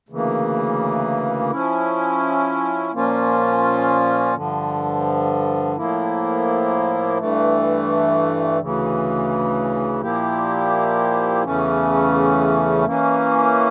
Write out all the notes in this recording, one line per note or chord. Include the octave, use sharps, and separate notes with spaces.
D2 C#3 E3 A#3
F3 C#4 E4
A#2 F3 A#3 C#4 F4
G2 D3 F3
A2 F3 A#3 E4
G2 E3 A3
D2 C#3 E3
A#2 F3 A#3 E4 G4
E2 C#3 E3 A3 C#4
E3 A#3 C#4